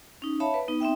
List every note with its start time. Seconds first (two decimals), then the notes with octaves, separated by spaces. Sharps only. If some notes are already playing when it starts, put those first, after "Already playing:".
0.22 C#4 D#4
0.40 C#5 E5 F5 A5 B5
0.54 B4
0.68 B3 D#4
0.80 C4 D#4 E5 G5